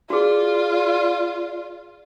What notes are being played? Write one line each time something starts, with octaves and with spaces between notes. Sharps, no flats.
F4 F#4 G#4 D5